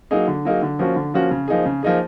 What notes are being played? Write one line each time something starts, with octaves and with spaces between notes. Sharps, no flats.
F#3 A#3 D#4 G#4
D3
F#3 A#3 D#4 G#4
D3
F3 A#3 C#4 F#4
D3
F3 A#3 C#4 F#4
C#3
F3 A#3 D#4 G#4
C#3
F3 A#3 D#4 G#4